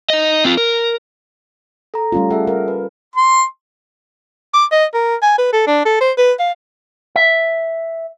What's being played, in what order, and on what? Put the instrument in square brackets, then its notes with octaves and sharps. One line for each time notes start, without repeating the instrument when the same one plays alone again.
[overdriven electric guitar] D#4 D#5
C4 F4
A#4
[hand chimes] A4 A#5
[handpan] G3 C#4 F4 [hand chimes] A3
[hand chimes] G#4 E5 F#5 [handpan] A4
[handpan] A#4
[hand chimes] B4
[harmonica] C6
[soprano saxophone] D6
D#5
A#4
G#5
B4
A4
D4
A4
C5
B4
F5
[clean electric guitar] E5